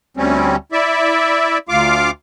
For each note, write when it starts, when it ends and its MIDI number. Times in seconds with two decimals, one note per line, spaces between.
0.17 0.56 38
0.17 0.56 55
0.17 0.56 60
0.17 0.56 61
0.72 1.58 64
0.72 1.58 74
0.72 1.58 76
1.69 2.10 38
1.69 2.10 65
1.69 2.10 77
1.69 2.10 86